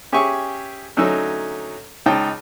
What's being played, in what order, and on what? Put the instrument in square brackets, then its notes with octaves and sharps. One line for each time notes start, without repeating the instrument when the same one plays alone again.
[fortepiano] C#4 G4 G#4 E5 G#5 C#6
D3 F#3 A3 C#4 D#4 E6
C#2 D#4 G5 A5